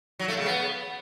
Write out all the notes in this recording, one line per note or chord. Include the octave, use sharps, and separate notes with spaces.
F#3
A3
C#3
B3